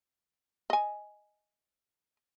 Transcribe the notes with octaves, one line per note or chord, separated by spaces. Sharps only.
D#5 G#5